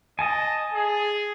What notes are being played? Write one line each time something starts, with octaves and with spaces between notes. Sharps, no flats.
D#5 G#5 A5 D#6
G#4